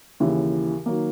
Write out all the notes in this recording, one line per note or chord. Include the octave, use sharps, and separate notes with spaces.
D#2 C#3 E3
D#3 F#3 A#3